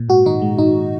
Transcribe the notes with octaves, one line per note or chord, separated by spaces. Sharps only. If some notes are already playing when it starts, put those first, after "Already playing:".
Already playing: A#2
G#2 F#4
D#3 D#4
G#3
G#2 D#4